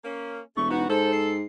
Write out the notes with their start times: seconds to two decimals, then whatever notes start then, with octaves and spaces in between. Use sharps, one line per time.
0.04 A#3 C#4
0.57 E1 A3 C#6
0.70 B3 D#4 F#4
0.89 G#2 A4 C5
1.13 C7